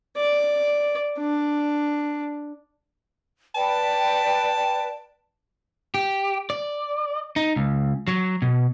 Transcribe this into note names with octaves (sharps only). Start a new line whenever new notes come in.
D5
D4
B4 D5 G5 A5
G4
D5
D#4
C#2
F#3
B2